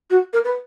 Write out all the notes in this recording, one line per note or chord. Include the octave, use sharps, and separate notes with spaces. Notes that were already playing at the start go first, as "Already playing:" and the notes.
F#4
A#4
B4